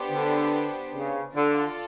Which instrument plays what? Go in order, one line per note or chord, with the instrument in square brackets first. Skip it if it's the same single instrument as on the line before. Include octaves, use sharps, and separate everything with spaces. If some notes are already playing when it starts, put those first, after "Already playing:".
Already playing: [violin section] B3 D4 G4 C5
[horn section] D3
C#3
[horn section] D3 [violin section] F4 A4 D5